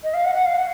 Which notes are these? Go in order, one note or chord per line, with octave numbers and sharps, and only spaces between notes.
D#5
F5
F#5
F#5
F5
F#5